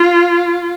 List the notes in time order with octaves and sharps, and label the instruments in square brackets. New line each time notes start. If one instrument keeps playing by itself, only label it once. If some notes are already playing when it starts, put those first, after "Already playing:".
Already playing: [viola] F4